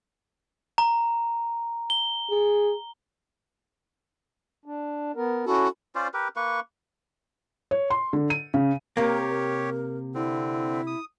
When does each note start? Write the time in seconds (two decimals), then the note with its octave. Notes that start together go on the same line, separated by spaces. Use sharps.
0.78 A#5
1.90 G7
2.31 G#4
4.66 D4
5.16 B3 A#4
5.46 C#4 E4 F#4 A4
5.95 C#4 F4 C5 D5
6.14 G4 A#4 B4
6.36 A#3 B4 C#6
7.71 C#5
7.90 C6
8.13 D3
8.30 D#7
8.54 C#3
8.97 C3 A#3 G4 A#4 C#5
9.29 A#4
10.15 D3 C4 E4
10.87 D#6